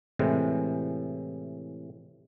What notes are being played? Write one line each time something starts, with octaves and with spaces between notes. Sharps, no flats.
A2 C3 E3 G#3